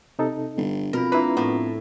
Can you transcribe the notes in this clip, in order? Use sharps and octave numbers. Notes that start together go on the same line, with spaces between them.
C3 D#4 A4
G1
F2 B2 F4 A#4 B5 A#6
A#3 D4 E4 F4 B4 A#5
A2 B3